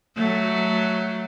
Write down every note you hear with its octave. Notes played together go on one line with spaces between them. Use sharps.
F#3 A3